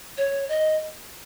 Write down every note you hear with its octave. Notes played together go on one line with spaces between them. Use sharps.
C#5
D#5